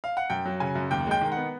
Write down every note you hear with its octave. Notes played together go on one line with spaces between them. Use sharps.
F5
F#5
F#2 G5
F#3
C#3 G#5
F#2
D#2 G5
G#3 G5
D#3
F#5
B3